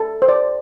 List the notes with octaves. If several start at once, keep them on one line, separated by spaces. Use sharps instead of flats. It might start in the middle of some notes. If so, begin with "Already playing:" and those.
Already playing: A4
C5
D5